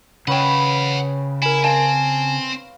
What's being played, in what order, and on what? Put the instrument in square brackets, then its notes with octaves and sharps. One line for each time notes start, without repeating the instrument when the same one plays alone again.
[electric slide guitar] C#3 [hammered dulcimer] B4 C#5 G5 [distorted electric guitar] E5 F#5
[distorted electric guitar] E4 [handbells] A#4 G#5
[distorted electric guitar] C4 [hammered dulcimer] F5 [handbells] G#5 A5